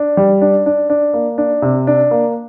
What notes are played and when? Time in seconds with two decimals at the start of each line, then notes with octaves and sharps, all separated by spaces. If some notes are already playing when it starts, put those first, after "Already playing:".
Already playing: D4
0.17 G3
0.42 D4
0.66 D4
0.90 D4
1.14 A#3
1.38 D4
1.62 C3
1.87 D4
2.11 A#3